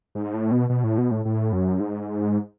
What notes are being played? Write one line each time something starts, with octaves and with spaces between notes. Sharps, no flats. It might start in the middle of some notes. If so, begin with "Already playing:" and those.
G#2
A2
B2
B2
A2
B2
A2
A2
F#2
G#2